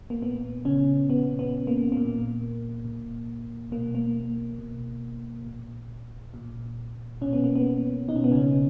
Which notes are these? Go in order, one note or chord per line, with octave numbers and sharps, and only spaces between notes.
A#3
A#2 B3
C#3 C#4
A#2 B3
B3
A#3
A#2 A#3
A#2
B2 A#3
A#3
B2
A#2
A#2
B2 C#4
B3
A#3
B3
B2 D#4
C#4
B3
C#3 C#4